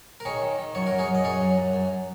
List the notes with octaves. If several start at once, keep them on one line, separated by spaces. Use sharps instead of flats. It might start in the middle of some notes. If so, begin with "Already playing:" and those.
A#4
D#3 G#4 C#5
D#3
D#3
F#2 C#5
F#2 A#4
G#4 C#5
F#2
D#5
F#2 G#4 C#5
F#2
F#2
F#2